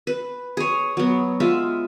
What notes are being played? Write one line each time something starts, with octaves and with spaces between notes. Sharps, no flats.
B4
G#4 C#5
F#3 B3
G#3 F4 E5